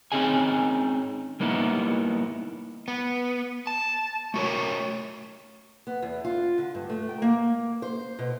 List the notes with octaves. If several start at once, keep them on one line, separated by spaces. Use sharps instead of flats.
C4 C#4 D#4 G#4 G#5
G3 A#3 B3 D#4 E4
B3
A5
A3 F#4 A#4 C#5
B3
E2
F4
D3
G2
A3
G5
A#3
C5
B2